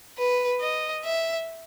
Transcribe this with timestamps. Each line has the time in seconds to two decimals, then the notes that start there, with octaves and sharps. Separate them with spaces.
0.18 B4
0.61 D#5
1.04 E5